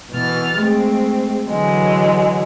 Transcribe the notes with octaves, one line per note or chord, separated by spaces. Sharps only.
B2 E3 F6 A6
G#3 A3 C4
D3 E3 F#3 G#3